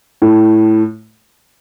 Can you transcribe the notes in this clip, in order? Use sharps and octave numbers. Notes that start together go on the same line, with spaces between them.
A2